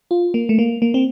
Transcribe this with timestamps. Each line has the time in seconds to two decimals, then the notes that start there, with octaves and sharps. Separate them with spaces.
0.11 F4
0.34 A#3
0.49 A3
0.59 A#3
0.82 A#3
0.94 C4